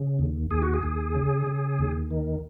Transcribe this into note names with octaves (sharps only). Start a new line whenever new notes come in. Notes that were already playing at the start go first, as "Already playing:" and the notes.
Already playing: C#3
D#2
D#2 G#4
F#4
G#4
D#2
C#3
C#3
D#2
D#3